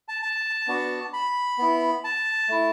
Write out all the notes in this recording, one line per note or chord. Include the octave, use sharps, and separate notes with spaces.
A5
A5
B3 D4 F#4
B5
B3 E4
A5
A3 E4